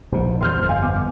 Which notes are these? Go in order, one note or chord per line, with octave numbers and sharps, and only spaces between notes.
A#1 B2 C5
E2 G2 D3 C5 C6 F6 G6
G1 F2
D#5 F5 G#5
B3 D6